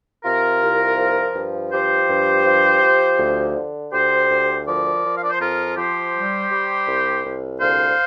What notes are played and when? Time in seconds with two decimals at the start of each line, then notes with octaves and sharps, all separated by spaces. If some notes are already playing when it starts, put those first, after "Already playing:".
0.24 C3 F4 A#4
0.61 C2
0.98 F3
1.35 G2
1.71 F3 G4 C5
2.08 G2
2.45 F3
2.82 F3
3.19 D2
3.56 D3
3.92 D2 G4 C5
4.29 D2
4.66 F3 A#4 D5
5.03 F3
5.14 F5
5.23 D5
5.31 C5
5.40 F2 F4 A#4
5.76 F3 G4 C5
6.13 G3
6.50 G3
6.87 C2
7.24 C2
7.60 D2 C5 F5